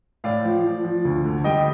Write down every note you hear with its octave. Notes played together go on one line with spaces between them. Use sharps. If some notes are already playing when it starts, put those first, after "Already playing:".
A2 D5 F5
F3
F3
F3
D2
D3
G3 D#5 G5